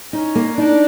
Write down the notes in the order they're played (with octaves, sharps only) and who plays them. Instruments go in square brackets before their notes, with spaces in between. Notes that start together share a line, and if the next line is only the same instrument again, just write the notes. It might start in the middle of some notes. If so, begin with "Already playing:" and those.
[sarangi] C#4 [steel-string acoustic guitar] D#4
[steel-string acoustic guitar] A#3
[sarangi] D4 [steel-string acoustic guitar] D#4